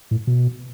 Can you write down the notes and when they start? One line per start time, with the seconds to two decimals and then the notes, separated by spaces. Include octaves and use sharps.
0.11 A2
0.27 B2